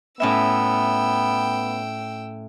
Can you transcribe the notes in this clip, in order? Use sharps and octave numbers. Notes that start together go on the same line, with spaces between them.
A2 B3 C#4 E5 G5 E6